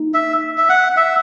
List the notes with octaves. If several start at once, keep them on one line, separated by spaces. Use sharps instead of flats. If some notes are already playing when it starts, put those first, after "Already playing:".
Already playing: A#3 D#4
E5
E5
F#5
E5